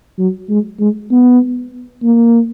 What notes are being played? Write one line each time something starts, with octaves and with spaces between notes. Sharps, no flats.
F#3
G#3
G#3
B3
A#3